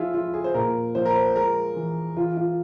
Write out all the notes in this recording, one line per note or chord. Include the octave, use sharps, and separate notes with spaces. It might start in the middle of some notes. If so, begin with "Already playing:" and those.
Already playing: F3 E4 F4 G#4
F3 F4
G#4
C5
A#2 A#4
F3 C5
A#4
C5
G#3 A#4
E3
E3 F4
F4